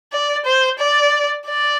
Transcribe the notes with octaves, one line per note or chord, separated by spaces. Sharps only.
D5
C5
D5
D5